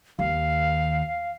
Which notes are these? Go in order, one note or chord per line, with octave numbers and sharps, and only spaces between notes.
D#2 F5